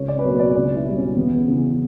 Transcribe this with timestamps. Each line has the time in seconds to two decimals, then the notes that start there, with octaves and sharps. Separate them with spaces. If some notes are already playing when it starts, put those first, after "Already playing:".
Already playing: C#2 C#5
0.08 D5
0.19 B4
0.24 B2 F#3 A#3 C#5
0.39 D5
0.55 C#2 D5
0.76 E4
0.86 B2 G3
0.96 C#4
1.16 E2 B3
1.48 C#3 E3